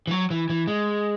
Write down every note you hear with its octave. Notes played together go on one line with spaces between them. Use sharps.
E3
F#3
E3
E3
G#3